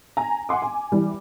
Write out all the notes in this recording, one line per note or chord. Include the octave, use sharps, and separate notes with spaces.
G#5 A#5
F#5 G#5 C6 D6
G#5
E3 G3